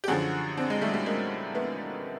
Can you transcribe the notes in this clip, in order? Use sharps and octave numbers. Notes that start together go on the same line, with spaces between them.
G4
F#2 D3 F3 F#4 G#4
C4 D4
G#3
G3 A3
G#3
G3 A3
G#3 A#3
A3 B3